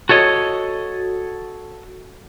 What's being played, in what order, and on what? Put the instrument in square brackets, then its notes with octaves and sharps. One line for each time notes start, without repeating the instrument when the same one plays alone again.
[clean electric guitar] F#4 A4 C#5 D#5